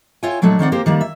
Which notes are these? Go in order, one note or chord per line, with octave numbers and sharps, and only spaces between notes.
F4 C#5 E5 G5 G#5
A#2 F#3 G#3 A3 D4
D#3 C4 D5 F#5
A#3 G4 A#4 C5
D#3 G3 A#3
E5